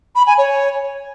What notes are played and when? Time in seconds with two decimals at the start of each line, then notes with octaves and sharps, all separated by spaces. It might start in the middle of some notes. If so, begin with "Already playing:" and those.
0.16 B5
0.27 G#5
0.38 C#5